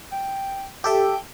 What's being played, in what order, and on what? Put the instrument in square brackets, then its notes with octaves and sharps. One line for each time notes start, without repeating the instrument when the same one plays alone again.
[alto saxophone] G5
[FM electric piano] G4 A4 E5 [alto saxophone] G5